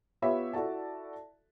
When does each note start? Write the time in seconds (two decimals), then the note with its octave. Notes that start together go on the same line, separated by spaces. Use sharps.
0.22 B3 F4 G4 C#5 E5 B5
0.53 E4 F#4 A4 D5 A5